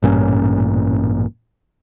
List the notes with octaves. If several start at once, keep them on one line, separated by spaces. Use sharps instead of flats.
A1 G2 A#2 C#4